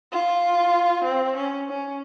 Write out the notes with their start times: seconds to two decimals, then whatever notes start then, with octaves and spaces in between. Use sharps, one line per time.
0.12 F4
1.04 C4
1.36 C#4
1.69 C#4